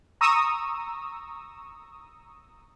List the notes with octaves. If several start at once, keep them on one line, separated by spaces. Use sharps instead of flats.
A#5 C#6 D#6 E6